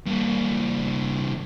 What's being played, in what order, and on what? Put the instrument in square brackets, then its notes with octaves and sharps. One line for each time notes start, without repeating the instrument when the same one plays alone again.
[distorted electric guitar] G2 A#3